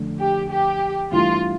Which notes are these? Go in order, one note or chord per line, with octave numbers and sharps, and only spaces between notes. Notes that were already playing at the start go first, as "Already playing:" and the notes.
Already playing: F2 D3 A3
G4
G4
G2 E3 A3 E4 F4